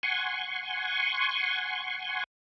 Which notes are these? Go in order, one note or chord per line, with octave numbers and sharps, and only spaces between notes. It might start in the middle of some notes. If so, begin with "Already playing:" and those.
F#5 G#5 C6 C#6